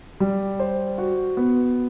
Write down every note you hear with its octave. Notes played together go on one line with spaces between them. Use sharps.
G3
C5
F#4
B3